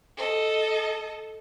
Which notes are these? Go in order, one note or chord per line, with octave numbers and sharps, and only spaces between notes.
A4 D#5